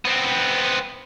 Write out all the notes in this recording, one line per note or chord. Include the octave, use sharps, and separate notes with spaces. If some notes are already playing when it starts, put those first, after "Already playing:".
B3 C4